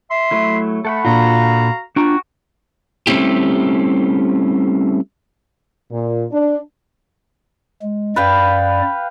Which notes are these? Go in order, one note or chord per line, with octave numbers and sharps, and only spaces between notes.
E5 C6
F#3 A3 E4
A3 A4 F#5 B5
A#2 D4 F4 F#4 F5 A#5
D4 F4 F#4 G5 A#5 C#6
G3 A3 C4 C#4 E4 G4
A#2
D4
G#3
F#2 B4 D5 F5 G5